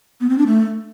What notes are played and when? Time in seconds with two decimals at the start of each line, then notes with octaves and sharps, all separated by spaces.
0.21 B3
0.29 C4
0.38 D4
0.47 A3